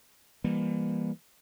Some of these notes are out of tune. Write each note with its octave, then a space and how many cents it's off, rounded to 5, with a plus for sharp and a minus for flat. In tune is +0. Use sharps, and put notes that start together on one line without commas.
E3 +25 G3 +40 A#3 +30